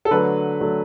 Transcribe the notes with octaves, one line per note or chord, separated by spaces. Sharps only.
A4
D3 F#3 A3 B4
D3 F#3 A3